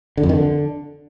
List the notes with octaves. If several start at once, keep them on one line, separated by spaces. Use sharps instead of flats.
D3
F2
D#3
D3